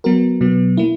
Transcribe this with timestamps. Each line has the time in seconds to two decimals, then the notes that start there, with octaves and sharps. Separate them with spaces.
0.04 F#3 B3 F#4 A#4
0.41 B2 F#3 B3
0.77 A#3 E4